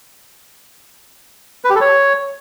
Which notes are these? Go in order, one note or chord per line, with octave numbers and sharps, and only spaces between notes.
B4
G4
A4
C#5